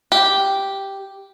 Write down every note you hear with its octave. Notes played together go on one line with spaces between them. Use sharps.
G4